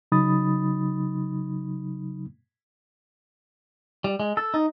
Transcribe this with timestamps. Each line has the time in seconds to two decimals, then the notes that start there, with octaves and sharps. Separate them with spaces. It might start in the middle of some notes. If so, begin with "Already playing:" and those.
0.12 C#3 F#3 D#4 B5 D#6 A6
4.04 G3
4.20 G#3
4.37 A4
4.54 D#4